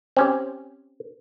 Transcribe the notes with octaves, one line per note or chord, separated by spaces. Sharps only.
C4 C#4 G4